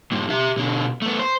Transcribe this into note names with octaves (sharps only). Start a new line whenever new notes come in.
G2 A#2
G4 E5
B2 D3
A3 B3
C5